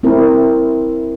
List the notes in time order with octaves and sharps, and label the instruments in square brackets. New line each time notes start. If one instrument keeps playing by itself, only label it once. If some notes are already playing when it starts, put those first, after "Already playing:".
[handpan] C4 E4 A#4